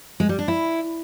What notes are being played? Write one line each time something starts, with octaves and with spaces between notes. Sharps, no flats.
G#3
G3
D4
E4